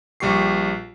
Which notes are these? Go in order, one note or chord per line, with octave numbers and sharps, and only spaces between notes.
A#1 G3 G4 C#6 C7